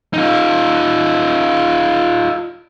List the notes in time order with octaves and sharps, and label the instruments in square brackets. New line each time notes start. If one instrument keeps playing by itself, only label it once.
[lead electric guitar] D#4 F4